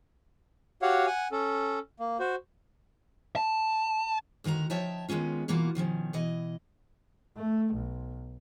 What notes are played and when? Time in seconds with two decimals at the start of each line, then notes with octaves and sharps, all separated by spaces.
0.82 F#4 G4 C#5 F5 F#5
1.07 F#5 G#5
1.31 C#4 A4
2.00 A#3
2.19 F#4 C5
3.36 A5
4.44 D2 D#3 F#4 A4 A#5
4.70 F3 D#4 C#5 E5 G5 A5
5.09 D#3 G#3 B3 C#4 F4
5.48 B2 E3 A#3 F4 F#4
5.75 B2 D#3 F3 C#4
6.13 B2 E3 D#5
7.37 A3
7.74 B1